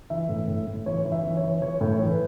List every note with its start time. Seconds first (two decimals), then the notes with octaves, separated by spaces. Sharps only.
0.10 E3 E5
0.29 A2
0.48 A2
0.67 A2
0.86 E3 C#5
1.05 E3
1.12 E5
1.23 E3
1.37 C#5
1.43 E3
1.61 E3 C#5
1.81 A2
1.87 C#5
1.99 E3
2.11 B4